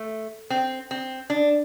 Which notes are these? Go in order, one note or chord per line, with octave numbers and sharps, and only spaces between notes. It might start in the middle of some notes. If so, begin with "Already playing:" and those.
Already playing: A3
C4
C4
D4